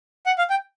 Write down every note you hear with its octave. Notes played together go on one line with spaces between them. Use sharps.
F#5
F5
G5